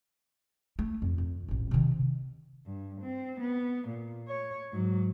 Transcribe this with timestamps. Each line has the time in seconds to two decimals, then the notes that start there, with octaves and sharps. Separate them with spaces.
0.79 A3
1.02 F2
1.18 F2
1.48 D#1 A1
1.71 C3 D#3
2.66 G2
3.01 C4
3.40 B3
3.88 A#2
4.29 C#5
4.73 G#2 F#3